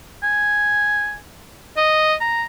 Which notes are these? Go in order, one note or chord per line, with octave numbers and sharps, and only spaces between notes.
G#5
D#5
A#5